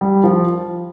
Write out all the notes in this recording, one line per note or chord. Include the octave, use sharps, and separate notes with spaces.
G3
F3